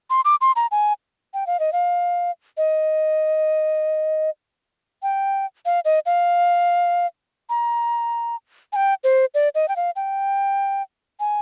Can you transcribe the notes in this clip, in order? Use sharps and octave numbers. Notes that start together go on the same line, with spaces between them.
C6
D6
C6
A#5
G#5
G5
F5
D#5
F5
D#5
G5
F5
D#5
F5
A#5
G#5
G5
C5
D5
D#5
G5
F5
G5
G#5